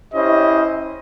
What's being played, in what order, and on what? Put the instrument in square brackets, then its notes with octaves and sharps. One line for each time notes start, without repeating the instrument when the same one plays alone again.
[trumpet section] C#4 E4 G4 C5 D#5